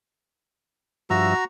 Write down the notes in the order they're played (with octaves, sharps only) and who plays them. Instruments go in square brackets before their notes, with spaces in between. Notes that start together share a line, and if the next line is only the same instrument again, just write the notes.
[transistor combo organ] G2 F3 E5 [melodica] F#4 A#5